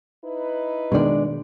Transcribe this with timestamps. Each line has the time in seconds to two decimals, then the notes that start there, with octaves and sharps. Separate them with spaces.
0.25 D#4 E4 B4
0.92 B2 D#3 G#3 D4 D5